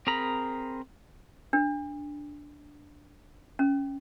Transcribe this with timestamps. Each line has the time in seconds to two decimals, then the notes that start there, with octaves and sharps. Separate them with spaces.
0.07 C4 G#4 A#4 A#5 B5
1.53 D4
3.59 C#4